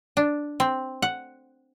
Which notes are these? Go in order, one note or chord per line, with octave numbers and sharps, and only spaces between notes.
D4
C4
F#5